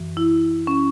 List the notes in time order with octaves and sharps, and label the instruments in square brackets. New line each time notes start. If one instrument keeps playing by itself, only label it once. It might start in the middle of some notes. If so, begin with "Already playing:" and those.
Already playing: [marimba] F#2 E3
E4
C#4